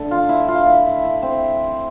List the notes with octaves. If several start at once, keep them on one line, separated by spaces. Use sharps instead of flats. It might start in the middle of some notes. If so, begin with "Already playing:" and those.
Already playing: D3 A3 A4
F4
E4
F4
E4
E4
E4
C4